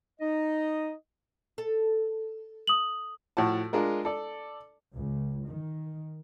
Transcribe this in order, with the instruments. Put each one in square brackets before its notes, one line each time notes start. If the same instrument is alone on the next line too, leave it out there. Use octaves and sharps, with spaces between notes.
[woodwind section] D#4 D#5
[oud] A4
[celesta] D#6 F#7
[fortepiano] A2 F3 F#4 A5
G#3 D4 F4 A#4
A4 D5
[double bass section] C#2
D#3